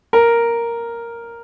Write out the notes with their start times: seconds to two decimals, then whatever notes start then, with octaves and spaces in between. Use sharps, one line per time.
0.13 A#4